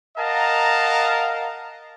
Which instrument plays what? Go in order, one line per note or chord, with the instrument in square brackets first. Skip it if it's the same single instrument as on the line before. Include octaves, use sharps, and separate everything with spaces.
[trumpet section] A#4 D#5 F5 F#5 A5 A#5